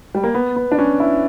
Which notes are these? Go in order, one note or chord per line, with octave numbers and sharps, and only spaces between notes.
G3
A#3
B3
B3
D4
C#4
E4